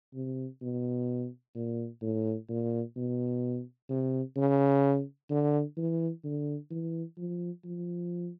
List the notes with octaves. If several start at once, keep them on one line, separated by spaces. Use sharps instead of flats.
C3
B2
A#2
A2
A#2
B2
C3
C#3
D3
E3
D3
E3
F3
F3